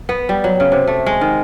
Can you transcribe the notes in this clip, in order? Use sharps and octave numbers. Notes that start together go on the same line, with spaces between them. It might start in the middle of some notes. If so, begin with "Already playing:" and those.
B3
G3
F#3
C#3
C3
A3
G#3
D#3